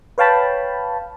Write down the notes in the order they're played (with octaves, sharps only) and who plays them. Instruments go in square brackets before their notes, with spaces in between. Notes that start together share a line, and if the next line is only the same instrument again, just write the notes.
[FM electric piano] B4 C#5 F5 G5 A5 B5